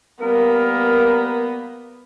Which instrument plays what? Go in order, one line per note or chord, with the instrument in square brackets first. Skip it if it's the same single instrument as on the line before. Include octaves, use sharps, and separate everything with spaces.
[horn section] G3 A#4 [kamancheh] A#3 B3